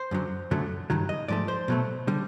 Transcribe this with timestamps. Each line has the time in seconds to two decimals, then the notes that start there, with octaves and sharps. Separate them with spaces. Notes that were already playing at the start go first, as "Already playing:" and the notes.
Already playing: C5
0.11 F#2 D3 F#3
0.51 F#2 D3 F#3 A3
0.90 G2 D#3 F#3
1.09 D#5
1.28 G#2 F3 A3 D5
1.48 C5
1.68 B2 F#3 A3
2.07 D3 G3